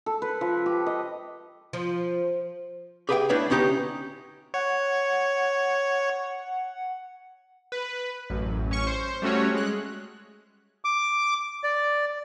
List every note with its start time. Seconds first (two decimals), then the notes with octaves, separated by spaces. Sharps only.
0.06 A4
0.22 B4
0.41 F3
0.66 G4
0.86 D#5
1.73 F3
3.09 G4 G#4 B4 E5 F5 G5
3.29 A3 D4 E4 B4 C#5 E5
3.50 D2 C#4 D#4 G4 A#5
4.54 C#5 F#5
7.72 B4
8.30 A1 F#2
8.69 A1 C#4 C#6
8.87 C5
9.22 G3 A3 C#4 F#4 C#5
9.54 G#3 F#6
10.85 D6
11.64 D5